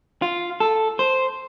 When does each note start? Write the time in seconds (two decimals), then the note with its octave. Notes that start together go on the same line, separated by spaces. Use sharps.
0.22 F4
0.60 A4
0.99 C5